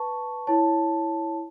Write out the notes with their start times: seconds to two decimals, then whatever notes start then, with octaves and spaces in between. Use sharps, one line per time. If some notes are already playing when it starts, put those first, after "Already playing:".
Already playing: B4 A5 C#6
0.47 E4 C#5 A5